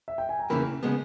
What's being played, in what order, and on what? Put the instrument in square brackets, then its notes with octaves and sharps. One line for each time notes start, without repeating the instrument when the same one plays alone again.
[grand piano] E5
G5
G#5
A#5
[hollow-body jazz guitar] E2 C#3 E3 A#3 [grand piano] B5
[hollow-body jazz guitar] C#3 G#3 B3